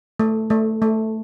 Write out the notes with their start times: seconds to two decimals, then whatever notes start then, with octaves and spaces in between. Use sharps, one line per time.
0.20 A3
0.50 A3
0.82 A3